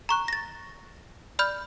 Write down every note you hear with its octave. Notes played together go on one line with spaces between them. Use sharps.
A#5 C#6 F#6
A6 A#6
D5 B5 F6 G6